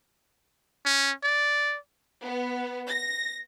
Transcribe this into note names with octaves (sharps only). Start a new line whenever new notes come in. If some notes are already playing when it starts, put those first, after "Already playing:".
C#4
D5
B3
A#6